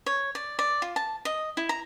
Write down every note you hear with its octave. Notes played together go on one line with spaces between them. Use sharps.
C#5
D5
D5
F4
A5
D#5
E4
A#5